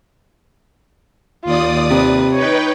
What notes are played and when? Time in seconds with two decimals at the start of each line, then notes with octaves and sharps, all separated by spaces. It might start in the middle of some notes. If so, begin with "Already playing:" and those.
1.45 D#2 F4 D5 D#6
1.90 C3 B4
2.33 D#4 B4 C#5 G5